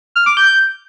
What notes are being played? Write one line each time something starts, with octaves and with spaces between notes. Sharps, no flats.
F6
D6
G6